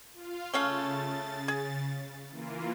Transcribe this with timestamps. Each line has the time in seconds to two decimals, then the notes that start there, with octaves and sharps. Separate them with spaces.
0.13 F4 F5
0.54 C#3 A3 C#4 F5 A6
1.48 G#4
2.30 E3 A#3 F4